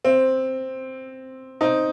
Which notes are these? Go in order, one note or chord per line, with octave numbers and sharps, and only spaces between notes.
C4
C4 D#4